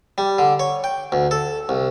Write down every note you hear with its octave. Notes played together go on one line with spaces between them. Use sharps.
G3
D3
C#5
G5
D2
A4
C2